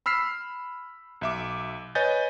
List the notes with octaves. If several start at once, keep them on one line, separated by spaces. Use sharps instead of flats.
B5 E6 F6 B6 C7
B1 E5 D6
B4 C#5 D#5 G#5 G6 A6